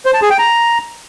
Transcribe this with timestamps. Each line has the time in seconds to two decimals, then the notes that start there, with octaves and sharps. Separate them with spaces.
0.06 C5
0.14 A5
0.22 G#4
0.30 G5
0.39 A#5